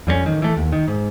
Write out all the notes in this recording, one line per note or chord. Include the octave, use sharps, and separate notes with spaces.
F2 G3 G#3 C#4
A1 D#3
E3 A3
D#2
D#3
G#2